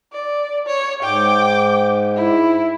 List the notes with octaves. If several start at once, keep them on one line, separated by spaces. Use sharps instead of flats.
D5
C#5
G#2 G5 D6
E4